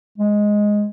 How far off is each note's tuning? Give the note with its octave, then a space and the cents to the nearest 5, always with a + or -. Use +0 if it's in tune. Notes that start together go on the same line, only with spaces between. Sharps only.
G#3 +0